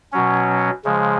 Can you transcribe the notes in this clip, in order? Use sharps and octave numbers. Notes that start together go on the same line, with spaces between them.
B2 F#3 C#4
C#3 F3 G#3